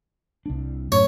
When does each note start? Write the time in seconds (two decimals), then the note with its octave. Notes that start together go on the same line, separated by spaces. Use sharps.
0.46 C2 D4
0.92 F#2 A2 C#4 C#5